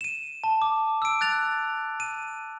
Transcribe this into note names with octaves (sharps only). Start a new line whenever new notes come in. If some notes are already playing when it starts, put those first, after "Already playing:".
D#7 E7
A5
D6
E6 D7
F#6 A6 F7
D#7